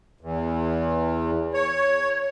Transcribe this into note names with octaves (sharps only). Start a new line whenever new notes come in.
E2
C#5